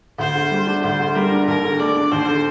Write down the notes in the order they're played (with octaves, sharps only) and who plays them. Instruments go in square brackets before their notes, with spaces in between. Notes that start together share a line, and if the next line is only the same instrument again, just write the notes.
[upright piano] D2 [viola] C5
[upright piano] D3
G3
D4
[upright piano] D2 [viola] C5
[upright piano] D3
[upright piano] G3 [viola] A#4
[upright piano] D4
[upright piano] D#2 [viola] A#4
[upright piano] D3
[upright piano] A3 [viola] D5
[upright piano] D4
[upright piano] D#2 [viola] C5
[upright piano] D3